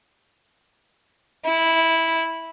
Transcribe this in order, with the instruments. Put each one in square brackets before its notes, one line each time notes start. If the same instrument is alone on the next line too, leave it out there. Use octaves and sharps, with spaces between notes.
[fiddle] E4